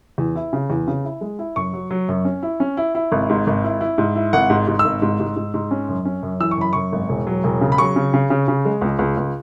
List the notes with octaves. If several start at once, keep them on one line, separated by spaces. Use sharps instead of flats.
E2
E4
C#3
E2
C#3
E4
G#3
E4
F#2 C#6
F#3
F#3
F#2
C#4
E4
C#4
E4
E4
G#1
G#2
G#1
E4
E4
G#2
E4
G#1 F#5
G#2
G#2
E6
G#1
G#2
G#2
G#2
G#2
C#4
F#2
C#4
F#2
E3 E6
C#6
F#2 B5
F#2 C#6
G#1
E1
F#3
E1
C#3
B5
F#3 C#6
C#3
C#3
C#3
C#3
G#3
C#2
C#2
C#2